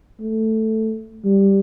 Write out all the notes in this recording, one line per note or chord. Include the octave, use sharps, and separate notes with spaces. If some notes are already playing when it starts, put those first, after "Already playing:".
A3
G3